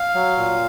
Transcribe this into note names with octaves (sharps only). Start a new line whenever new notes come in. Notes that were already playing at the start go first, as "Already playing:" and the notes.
Already playing: F5
F#3
A#2